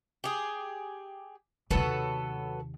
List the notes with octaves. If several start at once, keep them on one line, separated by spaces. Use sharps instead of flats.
G4 G#4
D#2 C3 F#3 B3 A4